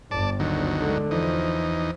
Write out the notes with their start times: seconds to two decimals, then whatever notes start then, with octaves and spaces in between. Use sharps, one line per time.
0.11 G1 D5 A5
0.40 D2 D#3 F#3
0.79 D3 G#3
1.11 E2 F3 D#4